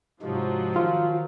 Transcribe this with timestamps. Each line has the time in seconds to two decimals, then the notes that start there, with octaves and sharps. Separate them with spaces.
0.22 G#2 C3 F3 F#3 G#3
0.76 D#3 F4